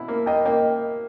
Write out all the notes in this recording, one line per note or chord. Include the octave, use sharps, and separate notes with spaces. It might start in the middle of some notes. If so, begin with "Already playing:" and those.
Already playing: B2 E4
A#3
A#3 D#5 G5
A#3 D#5 G5